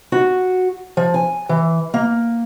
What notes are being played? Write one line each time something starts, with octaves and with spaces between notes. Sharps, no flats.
F#4
F3
G#5
E3
A#3